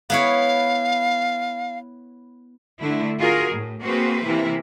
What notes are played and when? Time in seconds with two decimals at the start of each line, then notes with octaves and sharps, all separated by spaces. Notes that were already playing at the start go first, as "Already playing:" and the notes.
0.10 B3 E4 C#5 F5
2.80 D3 A3 D4 E4
3.18 F4 F#4 G#4 A#4
3.52 A2
3.82 A#3 C4 F#4 G#4 B4 C5
4.24 C3 E3 A#3 E4